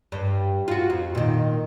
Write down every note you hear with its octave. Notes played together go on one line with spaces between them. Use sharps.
G2
F4 F#4
F2
A#2 D#3